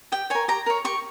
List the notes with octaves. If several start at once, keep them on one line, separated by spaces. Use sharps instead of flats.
G4 G5
A#4 C#5 G#5
G4 A#5
A#4 C#5
G4 C#6